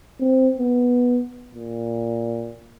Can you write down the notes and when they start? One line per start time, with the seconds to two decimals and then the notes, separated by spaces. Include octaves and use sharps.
0.20 C4
0.58 B3
1.54 A#2